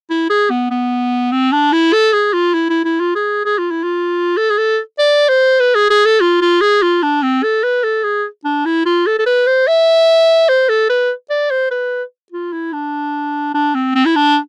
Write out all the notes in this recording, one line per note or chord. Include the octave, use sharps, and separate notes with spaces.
E4
G#4
B3
B3
C4
D4
E4
A4
G#4
F4
E4
E4
E4
F4
G#4
G#4
F4
E4
F4
A4
G#4
A4
D5
C5
B4
G#4
G#4
A4
F4
F4
G#4
F4
D4
C4
A4
B4
A4
G#4
D4
E4
F4
A4
A4
B4
C5
E5
C5
A4
B4
D5
C5
B4
F4
E4
D4
D4
C4
C4
E4
D4